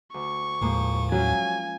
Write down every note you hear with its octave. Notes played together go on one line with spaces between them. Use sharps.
D2 C#6
D#2 A2 F3 G#3 A#3
F#3 C#4 F4 G#5